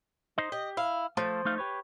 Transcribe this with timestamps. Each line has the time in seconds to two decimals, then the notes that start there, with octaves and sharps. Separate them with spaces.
0.38 D#4 C5 D#5
0.52 G4 D#5
0.77 E4 F5
1.17 F3 A3 F4 A4
1.45 A3 D#4 F5
1.58 G4 B4 C#5